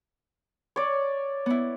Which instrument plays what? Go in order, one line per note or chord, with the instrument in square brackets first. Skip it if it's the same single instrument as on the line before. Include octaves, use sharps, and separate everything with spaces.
[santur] C#5 D5
[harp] B3 E4